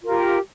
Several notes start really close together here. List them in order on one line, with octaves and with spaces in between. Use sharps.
F4 A#4 G4